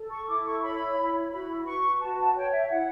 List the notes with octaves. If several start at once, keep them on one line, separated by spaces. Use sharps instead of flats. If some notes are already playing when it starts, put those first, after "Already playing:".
Already playing: A4
C#6
E4 D6
C#6
C#5 B5
E4
F#4 B5
B4 C#6
F#4 A5
A5
C#5 G5
E5
E4 F#5